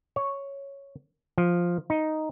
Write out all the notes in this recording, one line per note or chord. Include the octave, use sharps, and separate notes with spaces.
C#5
F3
D#4